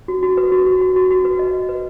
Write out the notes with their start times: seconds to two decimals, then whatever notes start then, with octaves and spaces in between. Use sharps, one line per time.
0.08 F#4
0.23 F#4
0.37 B4
0.52 F#4
0.67 F#4
0.81 F#4
0.96 F#4
1.11 F#4
1.25 B4
1.39 D#5
1.54 D#5
1.69 B4